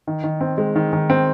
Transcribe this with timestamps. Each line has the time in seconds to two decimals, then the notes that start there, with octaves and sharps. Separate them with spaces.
0.07 D#3
0.24 D#3
0.41 C4
0.58 G#3
0.76 D#3
0.93 D#3
1.10 C4